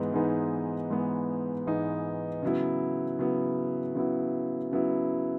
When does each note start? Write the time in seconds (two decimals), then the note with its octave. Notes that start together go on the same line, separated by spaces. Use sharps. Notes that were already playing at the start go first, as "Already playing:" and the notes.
Already playing: G#2 E3 G#3 B3 D#4
0.13 G#2 E3 G#3 B3 D#4
0.90 G#2 E3 G#3 B3 D#4
1.67 G#2 E3 G#3 B3 D#4
2.42 C#3 F#3 B3 E4
3.19 C#3 F#3 B3 E4
3.95 C#3 F#3 B3 E4
4.71 C#3 F#3 B3 E4